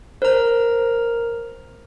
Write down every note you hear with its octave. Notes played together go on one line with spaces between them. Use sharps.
A#4 C5 A#5